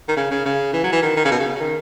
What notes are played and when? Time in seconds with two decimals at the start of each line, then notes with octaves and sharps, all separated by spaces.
0.08 D#3
0.16 C#3
0.31 C#3
0.46 C#3
0.73 E3
0.84 F#3
0.92 E3
1.02 D#3
1.17 D#3
1.25 C#3
1.31 B2
1.39 C#3
1.56 C#3
1.60 D#3